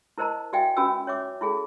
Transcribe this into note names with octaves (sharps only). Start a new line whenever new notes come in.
E4 A#4 C5 D#5 A5 A#5
F#4 D5 E5 F5 G5 G#5
C#4 F4 F#4 B4 G#5 E6
C#5 E5 D6
E4 F4 G#4 A4